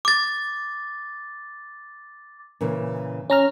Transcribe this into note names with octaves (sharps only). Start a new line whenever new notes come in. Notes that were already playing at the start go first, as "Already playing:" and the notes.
D6 A6
A#2 C#3 E3
C#4 A#5 F6